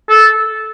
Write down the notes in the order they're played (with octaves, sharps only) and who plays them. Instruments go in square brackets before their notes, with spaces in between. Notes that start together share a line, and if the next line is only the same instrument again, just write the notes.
[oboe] A4